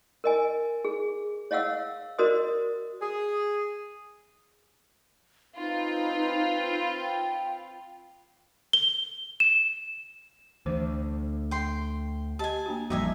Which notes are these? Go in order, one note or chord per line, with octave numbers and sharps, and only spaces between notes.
A#4 D#5 G#5
G#4
C#5 D#5 F5 F#5 E6
F#4 A#4 C5 D5 D#5 D#6
G#4
C4 D#4 F4 B4
G5
G7
E7
D2 D3 E3 C5
G5 C6
G4 D#5 G#5 A5
A#3 D4 F#4
A1 F2 G3 A#3 D#4 F#4 E5 G#5